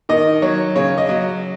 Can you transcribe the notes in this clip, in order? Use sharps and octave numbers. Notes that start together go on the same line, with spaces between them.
D#3 D#5
F#3 C#5
C#3 C#5
D#5
F#3